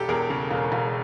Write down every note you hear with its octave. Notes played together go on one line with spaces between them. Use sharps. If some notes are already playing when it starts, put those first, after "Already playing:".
Already playing: E1 G4 A4
E2 G#4 A#4
C#3
E1
E1